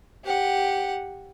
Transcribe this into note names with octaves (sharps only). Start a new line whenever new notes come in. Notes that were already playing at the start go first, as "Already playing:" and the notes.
G4 F#5